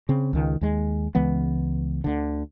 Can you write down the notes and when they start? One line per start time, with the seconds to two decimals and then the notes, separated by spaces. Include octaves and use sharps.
0.09 C#3 C4
0.33 C#2 D#3
0.61 D#2 G#3
1.15 C#2 E3 G#3 B3
2.04 D2 D3